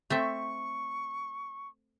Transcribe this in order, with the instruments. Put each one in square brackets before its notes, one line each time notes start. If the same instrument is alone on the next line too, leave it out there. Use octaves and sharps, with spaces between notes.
[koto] A3 C4 E5 [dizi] C#6